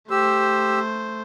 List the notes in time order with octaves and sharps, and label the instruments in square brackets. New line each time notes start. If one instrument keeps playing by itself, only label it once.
[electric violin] A3 C5 [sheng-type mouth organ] G4 E6